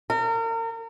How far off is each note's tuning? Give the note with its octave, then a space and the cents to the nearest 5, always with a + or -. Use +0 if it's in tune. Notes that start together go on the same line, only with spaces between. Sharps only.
A#4 -35